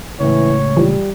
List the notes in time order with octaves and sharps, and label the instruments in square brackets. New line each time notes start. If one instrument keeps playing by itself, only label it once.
[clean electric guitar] C#2 A2 [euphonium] E3 [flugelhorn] C#5
[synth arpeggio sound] E3 F3 [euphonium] G3